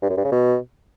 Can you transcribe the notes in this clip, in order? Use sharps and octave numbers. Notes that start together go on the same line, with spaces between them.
G2
F#2
G2
C#3
B2